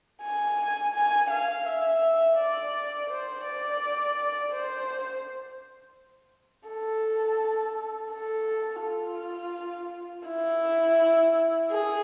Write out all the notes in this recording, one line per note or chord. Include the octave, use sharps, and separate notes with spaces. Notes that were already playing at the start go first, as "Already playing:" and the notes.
G#5
G#5
F5
E5
D5
C5
D5
C5
A4
A4
F4
E4
G#4